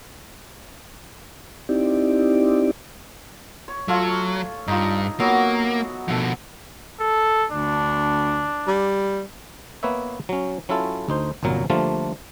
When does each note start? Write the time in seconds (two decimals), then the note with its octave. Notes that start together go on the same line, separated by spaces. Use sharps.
1.69 C4 D#4 E4 G4 D5
3.68 C#5
3.88 F#3 A3 F4 C#5
4.68 G2 D#4 F4
5.20 F#3 A#3 B3 F#4
6.08 B2 F3 A3 F#5
7.00 A4
7.52 D2 D4
8.67 G3
9.83 A#3 B3 B4 C#5 E5
10.29 F#3 C#4
10.69 F#3 C#4 E4 F4 A4
11.09 D2 D#4 C5
11.43 G1 C2 A#2 F#3 A#4
11.70 D3 F3 G3 A3 A#3 F4